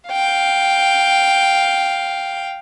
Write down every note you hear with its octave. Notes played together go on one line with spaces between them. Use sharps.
F5 G5